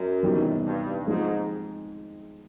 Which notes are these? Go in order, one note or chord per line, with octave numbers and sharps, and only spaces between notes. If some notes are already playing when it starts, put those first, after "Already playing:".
Already playing: F#2
C3 E3 G3 B3 D#4
G2
G#2 F3 G#3 C4 D#4